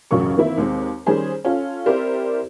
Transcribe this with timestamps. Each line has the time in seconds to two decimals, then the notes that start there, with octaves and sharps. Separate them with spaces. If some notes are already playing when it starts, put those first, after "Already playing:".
0.11 A1 F#2 C#3 F#3 A#4 C#6
0.37 D#3 E3 A#3 C4 E4
0.58 D#2 G#3 C4
1.06 D#3 G3 C#4 G#4 C5
1.45 C#4 F4 A4
1.86 C4 E4 G4 A#4 C5 D5